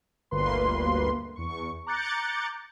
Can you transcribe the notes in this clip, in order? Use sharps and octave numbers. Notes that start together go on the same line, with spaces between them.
G1 D2 A#3 B4 C6
E2 C#6
A#5 D6 F#6 G6 A6 C#7